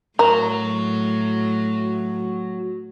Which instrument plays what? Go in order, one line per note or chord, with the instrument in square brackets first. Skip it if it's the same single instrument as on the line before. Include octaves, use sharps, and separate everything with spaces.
[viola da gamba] A2 [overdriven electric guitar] F#3 [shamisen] A#4